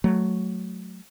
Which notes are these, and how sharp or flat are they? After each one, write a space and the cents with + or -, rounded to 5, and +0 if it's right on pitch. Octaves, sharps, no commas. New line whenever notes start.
F#3 +0 A3 -15